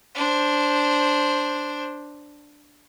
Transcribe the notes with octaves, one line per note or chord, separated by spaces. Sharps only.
D4 C5